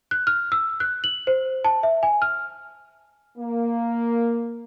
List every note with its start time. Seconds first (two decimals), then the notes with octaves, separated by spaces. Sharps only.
0.11 F#6
0.27 F6
0.52 E6
0.80 F#6
1.04 F#7
1.27 C5
1.64 A5
1.83 E5
2.03 G#5
2.22 F6
3.38 A#3